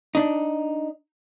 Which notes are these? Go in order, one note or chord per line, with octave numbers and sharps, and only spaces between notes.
D4 D#4